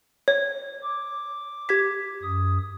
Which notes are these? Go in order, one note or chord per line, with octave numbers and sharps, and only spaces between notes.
C#5
D6
G4 G#6 B6
F#2 D#6